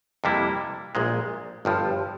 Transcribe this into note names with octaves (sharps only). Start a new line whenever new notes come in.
F2 C3 G3 A#3 E4
A#1 A#2 G#3
G1 G2 F3